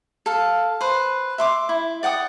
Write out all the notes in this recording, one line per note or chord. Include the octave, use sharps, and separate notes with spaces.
A4 F5
B4 C5
E5 C6 D6
E4
D5 F#5 G5 D#6